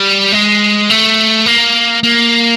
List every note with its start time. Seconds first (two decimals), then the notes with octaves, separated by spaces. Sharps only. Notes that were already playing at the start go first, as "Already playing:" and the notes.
Already playing: G3
0.32 G#3
0.90 A3
1.46 A#3
2.03 A#3